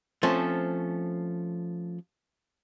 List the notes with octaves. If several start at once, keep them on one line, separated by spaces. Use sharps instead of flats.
F3 A3 C4 C#4